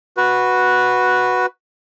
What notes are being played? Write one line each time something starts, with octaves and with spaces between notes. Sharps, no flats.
F#4 B4